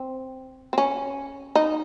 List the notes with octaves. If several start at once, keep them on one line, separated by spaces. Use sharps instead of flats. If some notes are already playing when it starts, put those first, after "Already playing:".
Already playing: C4
C4
C#4
D#4